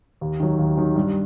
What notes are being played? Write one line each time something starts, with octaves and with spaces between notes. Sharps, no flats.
D#2
D#3 F#3
D#2
D#3 F#3
G2